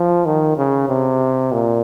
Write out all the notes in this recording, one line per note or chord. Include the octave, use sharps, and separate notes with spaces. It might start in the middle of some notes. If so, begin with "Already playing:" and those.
Already playing: F3
D#3
C#3
C3
A#2